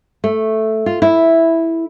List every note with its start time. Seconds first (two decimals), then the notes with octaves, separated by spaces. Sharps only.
0.24 A3
0.86 F4
1.02 E4